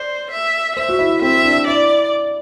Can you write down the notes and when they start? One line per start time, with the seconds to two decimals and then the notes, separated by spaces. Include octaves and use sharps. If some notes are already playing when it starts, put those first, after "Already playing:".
Already playing: C5 D5
0.31 E5
0.76 C5 E5
0.89 F#4
0.99 E4
1.22 C4 E5
1.44 D4
1.67 E4 D5